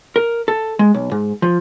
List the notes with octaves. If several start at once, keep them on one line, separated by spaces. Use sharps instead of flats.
A#4
A4
G#3
B1
G#2
F3